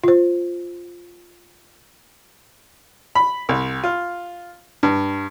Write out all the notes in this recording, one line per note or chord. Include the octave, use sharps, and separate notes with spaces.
F4 C5
B5
C2
F4
G2